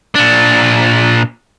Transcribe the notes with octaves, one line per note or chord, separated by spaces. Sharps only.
A#2 D4